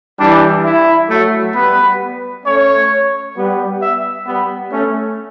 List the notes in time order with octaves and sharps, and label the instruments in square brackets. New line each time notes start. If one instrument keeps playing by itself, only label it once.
[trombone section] E3 G3 [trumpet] D4
[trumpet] E4
[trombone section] F#3 A3
[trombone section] G3 B3 [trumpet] B4
[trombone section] A3 C#4 [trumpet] C#5
[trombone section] G3 B3
[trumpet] E5
[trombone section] G3 B3
A3 C#4